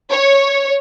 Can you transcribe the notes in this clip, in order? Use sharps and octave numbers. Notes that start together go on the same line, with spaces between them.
C#5